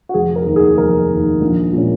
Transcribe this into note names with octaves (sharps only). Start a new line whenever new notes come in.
F#4
F1 G#4
A#4
D#2 D#3
G#4
F1 A#4
D#2 D#3
A#1
A#2 G#3 C#4